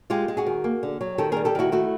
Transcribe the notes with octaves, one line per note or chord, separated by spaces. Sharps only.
G#3 F4 G4
G#3
F#4 G#4
D#3
A#3
D3
F#3
D#3 G4 A4
G#4 A#4
G3
G4 A4
D#3 E4 F#4
A3 E4 F#4